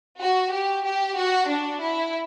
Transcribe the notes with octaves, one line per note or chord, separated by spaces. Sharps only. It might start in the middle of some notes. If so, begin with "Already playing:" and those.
F#4
G4
G4
F#4
D4
E4